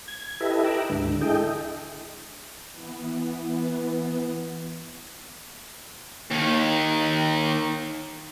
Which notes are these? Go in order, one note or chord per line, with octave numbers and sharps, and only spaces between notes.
G#6
E4 G4 A4 B4 D#5 E5
G5 A#5 D6 E6 F#6
D2 G#2 D3
E4 G#4 A4 D#5 G5
E3 B3
D#2 D#3